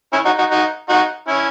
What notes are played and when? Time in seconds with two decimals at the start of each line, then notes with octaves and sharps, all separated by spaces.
0.13 C#4 E4
0.25 D#4 F#4
0.38 D#4 F#4
0.51 D#4 F#4
0.89 D#4 F#4
1.28 C#4 E4